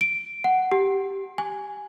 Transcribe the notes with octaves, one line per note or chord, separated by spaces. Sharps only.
D7
F#5
G4
G#5